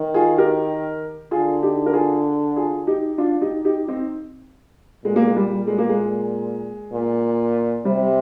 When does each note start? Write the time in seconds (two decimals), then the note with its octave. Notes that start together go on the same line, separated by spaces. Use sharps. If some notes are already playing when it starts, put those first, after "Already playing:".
Already playing: D#3
0.14 F4 G#4
0.38 G4 A#4
1.31 D3 F4 G#4
1.63 D#4 G4
1.86 A#4
1.93 F4 G#4
2.56 F4 G#4
2.87 D#4 G4
3.18 D4 F4
3.42 D#4 G4
3.65 D#4 G4
3.88 C4 D#4
5.05 A#2 G#3
5.16 A#3
5.26 G#3
5.36 G3
5.67 G#3
5.78 A#3
5.89 G#3
6.93 A#2
7.85 C3 G3